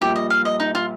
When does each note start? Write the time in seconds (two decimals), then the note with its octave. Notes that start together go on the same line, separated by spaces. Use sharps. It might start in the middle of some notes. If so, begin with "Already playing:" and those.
0.01 A#1 A#2 G3 G4
0.16 D#5
0.30 F5
0.45 D#5
0.60 D#4
0.75 F4